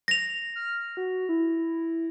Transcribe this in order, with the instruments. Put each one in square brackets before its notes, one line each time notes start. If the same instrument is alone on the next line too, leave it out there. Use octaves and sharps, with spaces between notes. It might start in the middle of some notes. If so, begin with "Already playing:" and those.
[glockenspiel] A#6 F7
[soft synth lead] F6
F#4
E4